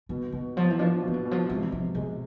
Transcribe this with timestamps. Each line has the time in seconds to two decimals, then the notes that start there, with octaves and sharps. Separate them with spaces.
0.09 B2 D3
0.32 B2 D3
0.56 F3 B3
0.70 E3
0.79 F3 D4
1.03 B2 E3
1.14 D3
1.25 B2
1.31 F3
1.49 C3 G#3
1.62 E3
1.72 C3 F3
1.95 B2 G#3